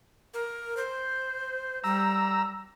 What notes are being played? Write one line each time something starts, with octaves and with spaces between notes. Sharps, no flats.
A#4
C5
G3 A#5 E6